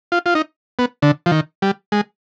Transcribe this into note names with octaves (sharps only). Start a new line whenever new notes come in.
F4
F4
D#4
B3
D3
F3
D#3
G3
G#3